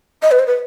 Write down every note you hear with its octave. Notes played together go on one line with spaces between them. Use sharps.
D#5
B4
C5
B4